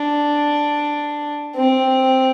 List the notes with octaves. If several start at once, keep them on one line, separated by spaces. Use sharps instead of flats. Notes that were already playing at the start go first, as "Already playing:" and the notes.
Already playing: D4
C4